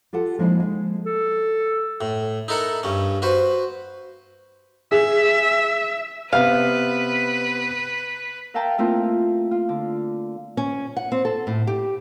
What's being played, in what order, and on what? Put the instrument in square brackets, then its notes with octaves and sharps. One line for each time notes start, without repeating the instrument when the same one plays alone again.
[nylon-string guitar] F4 G4 A4 F#5
F3 G#3 A#3 D#4 E4
G#3
[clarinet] A4
[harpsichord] A2
D#4 E4 A4 A#4 F#5
G2 C#4
F#4 B4 C5
[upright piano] G#4 [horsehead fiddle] E5
[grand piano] C3 B3 [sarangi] B4 [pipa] F5
[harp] A#4 E5 F5 G5 A5 A#5
A3 A#3 C4 E4 F4 A#4
F4
D3
[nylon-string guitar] C#4
F#5
C4
A4
A2
G4